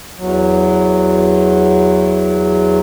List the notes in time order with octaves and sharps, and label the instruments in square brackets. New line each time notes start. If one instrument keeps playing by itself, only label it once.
[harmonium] E2 F#3